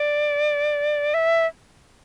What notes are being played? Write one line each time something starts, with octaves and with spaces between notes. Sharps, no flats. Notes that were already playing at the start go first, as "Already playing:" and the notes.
Already playing: D5
E5